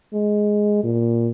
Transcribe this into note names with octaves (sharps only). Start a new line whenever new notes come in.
G#3
A#2